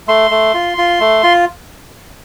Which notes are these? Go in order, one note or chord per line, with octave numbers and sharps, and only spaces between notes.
A3 C6
A3
F4
F4
A3
F4